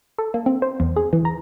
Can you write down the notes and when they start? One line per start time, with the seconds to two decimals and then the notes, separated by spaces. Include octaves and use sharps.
0.19 A4
0.34 A#3
0.46 C4
0.62 C5
0.80 E2
0.96 G#4
1.13 E3
1.25 A#5